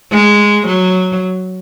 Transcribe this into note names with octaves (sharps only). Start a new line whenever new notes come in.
G#3
F#3